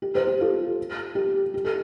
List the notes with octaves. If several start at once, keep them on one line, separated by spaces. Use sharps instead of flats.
G4
G4 C5
G4
F4 A4
G4
G4
A4